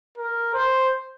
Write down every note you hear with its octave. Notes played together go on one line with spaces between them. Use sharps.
A#4
C5